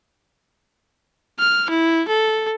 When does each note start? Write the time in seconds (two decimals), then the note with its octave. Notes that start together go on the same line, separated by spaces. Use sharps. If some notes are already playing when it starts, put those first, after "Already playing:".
1.39 F6
1.70 E4
2.08 A4